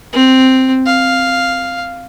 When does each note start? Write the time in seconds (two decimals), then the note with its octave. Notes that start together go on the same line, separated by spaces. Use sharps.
0.13 C4
0.86 F5